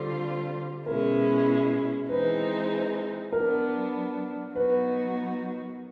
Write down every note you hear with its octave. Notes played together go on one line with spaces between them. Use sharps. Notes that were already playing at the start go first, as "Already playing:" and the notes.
Already playing: D3 G3 C4 F4 A4
B2 G#3 C#4 E4 A#4
E3 G#3 C4 D#4 B4
F#3 B3 D4 A#4
F#3 B3 D#4 F#4 B4